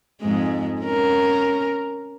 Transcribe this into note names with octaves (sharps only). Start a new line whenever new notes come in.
F2 G#2 G#3
C#4 A#4